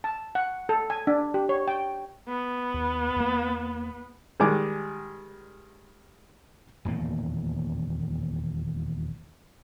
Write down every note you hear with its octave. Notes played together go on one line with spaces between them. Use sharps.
A5
F#5
A4
G#5
D4
G4
C#5
G5
B3
D#2
E2 A#3
D#3 G3 G#3 G#5 D6
D#1 E2 A2 A#3